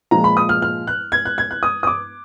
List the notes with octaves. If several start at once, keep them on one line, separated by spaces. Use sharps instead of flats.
A#2 F3 G#3 A#5
B5
D#6
F6
F6
F#6
G#6
F#6
G#6
F#6
D#6
D#6
D6